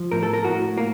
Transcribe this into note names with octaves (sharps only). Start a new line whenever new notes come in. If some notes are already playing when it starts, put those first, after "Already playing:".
Already playing: F3
A2 A#4
A4
A#4
A2 F#4
A#3